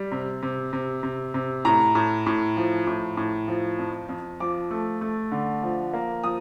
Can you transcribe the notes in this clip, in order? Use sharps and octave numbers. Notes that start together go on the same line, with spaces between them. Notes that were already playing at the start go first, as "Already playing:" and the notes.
Already playing: G3
C3
C3
C3
C3
C3
A2 A#5
A2
A2
F3
A2
A2
F3
F2
F2
F3 D6
A3
A3
D3
F3
A#3
F3 D#6